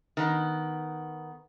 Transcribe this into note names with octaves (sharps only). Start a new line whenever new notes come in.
D#3 B3